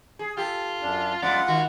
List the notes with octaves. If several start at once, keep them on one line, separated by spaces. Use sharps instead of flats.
G#4
F4 G4 A4
F#2 D4
F2 G#3 B3 F4 D5 F#5
D#3 F#4